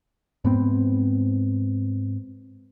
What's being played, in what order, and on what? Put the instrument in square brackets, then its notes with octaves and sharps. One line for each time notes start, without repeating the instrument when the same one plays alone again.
[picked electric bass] G#2 B3 C4